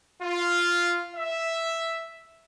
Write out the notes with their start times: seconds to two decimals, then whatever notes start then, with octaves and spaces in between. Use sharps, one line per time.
0.22 F4
1.14 E5